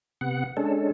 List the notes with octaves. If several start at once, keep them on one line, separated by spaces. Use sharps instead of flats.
C3 B3 F#5
G#3 C#4 D4 A4